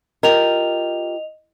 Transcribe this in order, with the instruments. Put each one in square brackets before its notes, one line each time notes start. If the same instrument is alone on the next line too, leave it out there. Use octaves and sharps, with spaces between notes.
[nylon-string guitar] F4 G4 A#4 [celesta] D#5 F7